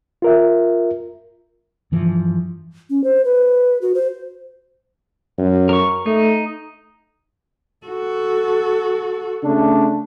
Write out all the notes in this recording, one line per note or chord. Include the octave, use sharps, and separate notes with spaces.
F4 A#4 E5
G2 E3 F3
C#4
C5
B4
F#4
C5
F#2
A#4 C#6
A3 D#4
F#4 A4
C#3 A3 D4